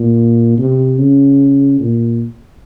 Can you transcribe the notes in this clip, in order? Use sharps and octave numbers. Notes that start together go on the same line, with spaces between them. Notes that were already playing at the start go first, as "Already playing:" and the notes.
Already playing: A#2
C3
C#3
A#2